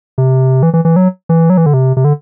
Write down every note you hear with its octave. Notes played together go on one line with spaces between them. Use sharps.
C3
E3
E3
E3
F#3
E3
F#3
E3
D3
C3
C3
D3